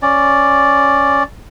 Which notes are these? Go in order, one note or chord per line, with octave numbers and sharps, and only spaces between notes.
C#4 D5